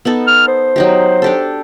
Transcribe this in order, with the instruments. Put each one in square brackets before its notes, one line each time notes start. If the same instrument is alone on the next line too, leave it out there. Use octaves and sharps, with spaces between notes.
[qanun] B3 D#4 A4
[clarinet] F6
C5
[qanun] F#3 D#4 G4
D4 G4 A4